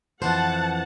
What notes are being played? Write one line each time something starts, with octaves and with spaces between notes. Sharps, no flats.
F2 E3 C5 F#5 A5